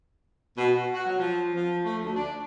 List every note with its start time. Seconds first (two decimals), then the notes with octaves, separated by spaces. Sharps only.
0.57 B2
0.74 F#4
0.93 F#4
1.06 F#3
1.19 F3
1.53 F3
1.85 A3
2.03 D2
2.16 D4